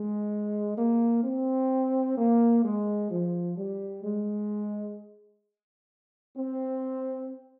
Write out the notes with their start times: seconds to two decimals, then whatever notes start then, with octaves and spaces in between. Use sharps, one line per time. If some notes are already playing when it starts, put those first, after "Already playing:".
Already playing: G#3
0.78 A#3
1.24 C4
2.18 A#3
2.64 G#3
3.11 F3
3.57 G3
4.04 G#3
6.38 C4